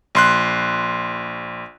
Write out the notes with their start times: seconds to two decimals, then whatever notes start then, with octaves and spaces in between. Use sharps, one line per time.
0.15 A#1 C6 F#6